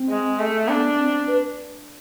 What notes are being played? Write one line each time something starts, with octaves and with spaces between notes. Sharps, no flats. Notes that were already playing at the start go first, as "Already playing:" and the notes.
Already playing: C4
G#3
A3
B3 D4
C4
B4